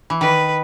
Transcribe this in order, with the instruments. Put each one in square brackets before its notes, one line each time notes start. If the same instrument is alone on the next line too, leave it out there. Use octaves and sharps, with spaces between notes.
[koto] E3
[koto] D#3 [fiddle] B4